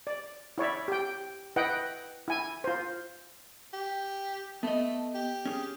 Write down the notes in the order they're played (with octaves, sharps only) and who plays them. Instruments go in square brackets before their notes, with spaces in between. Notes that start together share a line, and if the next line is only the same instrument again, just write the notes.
[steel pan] D5
E4 C#5 D5 E5
G4 G5
E4 B4 D#5 F#5 G5
E4 G#5
F4 C5
[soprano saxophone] G4
[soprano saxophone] A3 [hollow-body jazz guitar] B3 D#5
[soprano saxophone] G4
[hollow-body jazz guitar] C#4 G#4